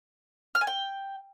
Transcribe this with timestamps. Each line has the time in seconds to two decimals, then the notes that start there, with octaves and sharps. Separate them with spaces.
0.55 F6
0.61 G#5
0.67 G5